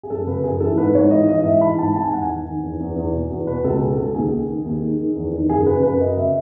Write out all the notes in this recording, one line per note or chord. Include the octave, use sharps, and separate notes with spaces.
G#4
F#2 A4
C#3 B4
F#2 G#4
E3 A4
G#2 B4
G#2 C#5
E3 D#5
E3 D#5
D#5
G#2 E5
E3 B5
G#2 A5
G#2 A5
G#5
E2 F#5
G#5
D#3
D#3
E2
E2
E2
B2
E2
B2 B4
C#2 A4
B2 G#4
C#2 A4
A4
D#2 G#4
D#3
D#3
D#2
D#3
D#3
E2
D#3
F#2 G#4
C#3 B4
F#2 B4
F#2 D#5
C#3 E5